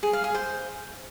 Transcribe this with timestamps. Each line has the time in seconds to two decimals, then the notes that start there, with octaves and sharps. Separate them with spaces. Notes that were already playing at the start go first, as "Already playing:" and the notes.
0.03 G#4
0.13 F5
0.24 G#4
0.34 C5